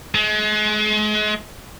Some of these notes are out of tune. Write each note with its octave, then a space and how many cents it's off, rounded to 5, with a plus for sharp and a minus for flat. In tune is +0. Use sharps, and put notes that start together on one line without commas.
G#3 +35